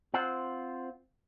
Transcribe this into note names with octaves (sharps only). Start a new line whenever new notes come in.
C4 F4 C5 F#5